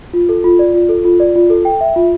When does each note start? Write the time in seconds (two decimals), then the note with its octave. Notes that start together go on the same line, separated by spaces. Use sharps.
0.14 F4
0.29 A4
0.44 F4
0.59 D5
0.74 F4
0.89 A4
1.05 F4
1.20 D5
1.36 F4
1.50 A4
1.65 G5
1.81 E5
1.96 F4